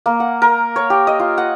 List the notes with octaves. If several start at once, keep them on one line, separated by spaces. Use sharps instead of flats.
A#3
F#5
A#4
C#5
G4
D#5
F4
F#5